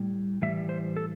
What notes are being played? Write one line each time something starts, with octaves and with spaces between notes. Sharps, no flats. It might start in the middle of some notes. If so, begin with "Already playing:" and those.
Already playing: A2 G3
A2 E3 G3 E5
C5
A4